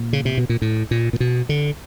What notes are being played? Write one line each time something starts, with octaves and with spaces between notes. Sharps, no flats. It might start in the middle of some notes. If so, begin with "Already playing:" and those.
Already playing: A#2
C#3
C3
B2
A#2
A2
A#2
A#2
B2
D3